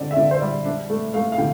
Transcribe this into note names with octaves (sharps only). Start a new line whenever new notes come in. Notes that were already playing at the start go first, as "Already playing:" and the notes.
Already playing: D3 C4 D5
E5
D3 D5
C5
G3 D5
D4
A3
A3 F5
F5
D3 G5